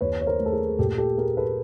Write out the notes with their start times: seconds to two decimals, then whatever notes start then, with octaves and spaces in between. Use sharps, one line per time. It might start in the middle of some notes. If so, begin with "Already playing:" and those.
0.01 D#2 B4 C#5
0.21 C#5
0.27 A#4 C5
0.39 A3
0.46 A4
0.52 G#4 A#4
0.68 G#4
0.79 A#2 G4 A4
0.98 G4 A4
1.17 A#3 G#4 A#4
1.37 A4 B4